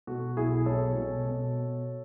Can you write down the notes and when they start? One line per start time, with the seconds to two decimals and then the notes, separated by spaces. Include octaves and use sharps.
0.07 B2 F#4 A4
0.37 B1 E4 G#4
0.66 B2 A4 C#5
0.96 B2
1.25 B2